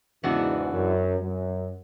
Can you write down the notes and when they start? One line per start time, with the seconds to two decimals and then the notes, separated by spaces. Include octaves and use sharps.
0.24 E2 G#2 C#3 E3 B3 D4 F#4
0.72 F#2
1.20 F#2